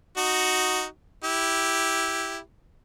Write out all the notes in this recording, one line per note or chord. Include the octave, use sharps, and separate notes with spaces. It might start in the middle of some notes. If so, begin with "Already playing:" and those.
D#4 F#4
E4 G4